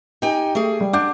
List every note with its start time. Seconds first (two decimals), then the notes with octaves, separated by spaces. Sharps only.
0.22 D#4 G4 G5 G#5
0.55 A3 G#4
0.81 G3
0.93 D4 F#5 D6 G6